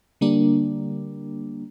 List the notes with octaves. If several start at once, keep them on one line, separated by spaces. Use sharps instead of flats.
D3 G3 A#3 D4